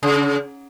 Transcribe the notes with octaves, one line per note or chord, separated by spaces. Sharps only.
C#3